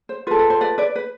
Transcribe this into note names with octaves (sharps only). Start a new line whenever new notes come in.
C5
F4 A4 B4
B4
C5
B4 D5
B4 D5
B4